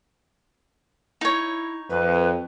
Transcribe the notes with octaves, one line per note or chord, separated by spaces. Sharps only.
D#4 E4 C#5
F2 B4